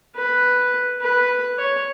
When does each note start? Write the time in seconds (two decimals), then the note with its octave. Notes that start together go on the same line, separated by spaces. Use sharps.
0.16 B4
1.01 B4
1.59 C#5